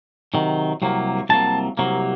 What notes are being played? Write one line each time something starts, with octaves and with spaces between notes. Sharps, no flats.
C3 D#3 F#3
C2 C3 F#3 A#3
C2 C3 F#3 A#3 A5
C2 C3 F#3 A#3